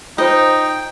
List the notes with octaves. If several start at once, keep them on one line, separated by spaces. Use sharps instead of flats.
D#4 F4 C5 D#5 G5